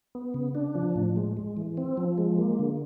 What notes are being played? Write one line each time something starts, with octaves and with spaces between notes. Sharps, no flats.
B3
C#3
D4
F3
A2
G#3
G#3
E3
C4
F3
G#3
A#3
D3